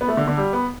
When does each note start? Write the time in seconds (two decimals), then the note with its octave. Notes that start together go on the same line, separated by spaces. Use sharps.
0.01 B3
0.08 A3
0.17 D3
0.27 D3
0.37 G3
0.53 B3